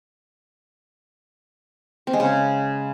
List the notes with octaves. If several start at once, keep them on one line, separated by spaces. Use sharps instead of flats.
C4
G#3
C#3